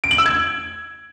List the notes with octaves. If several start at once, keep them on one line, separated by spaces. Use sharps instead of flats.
D7
F#7
E6
G#6